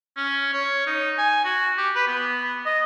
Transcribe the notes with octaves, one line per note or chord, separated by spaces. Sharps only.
C#4
C#5
D#4
G#5
F#4
G4
B4
B3
D#5